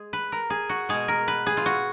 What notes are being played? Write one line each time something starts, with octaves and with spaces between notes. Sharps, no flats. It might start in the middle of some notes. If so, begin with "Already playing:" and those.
Already playing: G#3 G#4
B4
A#4
G#4
F#4
B2 G#3 G#4
A#4
B4
G#4
F4
F#4